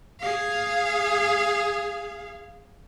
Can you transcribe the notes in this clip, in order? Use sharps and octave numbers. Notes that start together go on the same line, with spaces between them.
G#4 F5